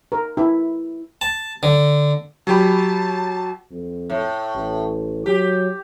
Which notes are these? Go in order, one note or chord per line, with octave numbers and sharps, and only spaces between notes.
A#4
E4
A5
D3
F#3 G4 A5 B5
F2
A2
A1
F#3 G4